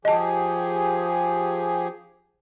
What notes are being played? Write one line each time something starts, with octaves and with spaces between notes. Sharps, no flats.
F3 G4 G#4 D#5 A5